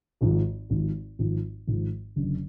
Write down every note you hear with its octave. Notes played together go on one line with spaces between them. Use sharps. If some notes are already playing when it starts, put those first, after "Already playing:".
G#1 G#2 F3
G#1 G#2 F3
G#1 G#2 F3
G#1 G#2 F3
F#1 F#2 D3